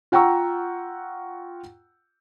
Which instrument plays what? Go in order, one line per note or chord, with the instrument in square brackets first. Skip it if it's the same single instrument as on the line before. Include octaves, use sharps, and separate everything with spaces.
[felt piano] F4 F#5 G5 A#5 C#6 E6